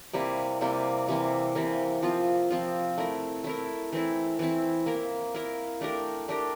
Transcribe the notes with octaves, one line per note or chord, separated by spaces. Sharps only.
C3 G3 A#3 E4
C3 G3 A#3 E4
C3 E3 A#3
C3 E3 A#3
F3 C4 F4
F3 C4 F4
A3 E4 A#4
A3 E4 A#4
E3 A3 C4 E4
E3 A3 C4 E4
A#3 E4 A#4
A#3 E4 A#4
A3 D4 G4 A#4
A3 D4 G4 A#4